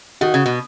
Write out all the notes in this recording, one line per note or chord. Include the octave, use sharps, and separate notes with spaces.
D#3 F#4
C#3
B2